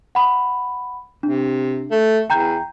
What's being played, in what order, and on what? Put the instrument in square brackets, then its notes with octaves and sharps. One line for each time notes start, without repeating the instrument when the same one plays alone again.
[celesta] F#5 B5
[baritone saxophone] C3 [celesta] D4
[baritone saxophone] A3
[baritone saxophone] E2 [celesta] G5 A#5 G6